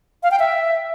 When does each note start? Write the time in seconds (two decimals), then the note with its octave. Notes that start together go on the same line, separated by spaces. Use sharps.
0.23 F5
0.31 G5
0.39 E5